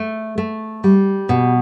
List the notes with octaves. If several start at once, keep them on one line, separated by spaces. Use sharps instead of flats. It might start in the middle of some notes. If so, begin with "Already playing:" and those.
Already playing: A3
A3
G3
B2